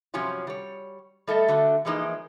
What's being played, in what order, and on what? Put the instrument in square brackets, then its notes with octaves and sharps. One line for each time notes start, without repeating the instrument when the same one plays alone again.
[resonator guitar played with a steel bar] G2 C3 F3 F#3 C#4 F4
G3 C#5
G3 A3 A4 D#5
D3 A3 F#4
E3 F3 G#3 A#3 D#4